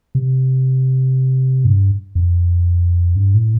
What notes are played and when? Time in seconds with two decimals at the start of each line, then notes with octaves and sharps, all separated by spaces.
0.15 C3
1.65 G2
2.15 F2
3.16 G2
3.35 A2